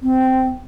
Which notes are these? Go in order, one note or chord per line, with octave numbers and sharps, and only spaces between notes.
C4